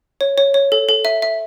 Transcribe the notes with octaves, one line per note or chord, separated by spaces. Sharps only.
C#5
C#5
C#5
A4
A4
E5
E5